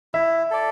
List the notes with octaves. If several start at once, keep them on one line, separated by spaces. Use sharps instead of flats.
E4 E5
A4 D5